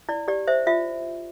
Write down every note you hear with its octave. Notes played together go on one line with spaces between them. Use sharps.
E4 D5
G4 D5
C5 E5
F4 E5